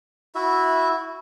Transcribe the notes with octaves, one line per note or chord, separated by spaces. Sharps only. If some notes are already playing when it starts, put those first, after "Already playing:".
E4 F#4 E5